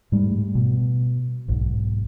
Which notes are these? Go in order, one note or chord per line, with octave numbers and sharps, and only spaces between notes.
G#2 G3 A3
B2
B1 G#2